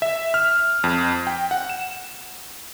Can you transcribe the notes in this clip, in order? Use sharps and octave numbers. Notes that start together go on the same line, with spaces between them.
E5
F6
F2
G5
F#5
E7